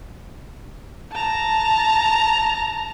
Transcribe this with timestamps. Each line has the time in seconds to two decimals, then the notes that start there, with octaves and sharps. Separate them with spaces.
1.12 A5 A#5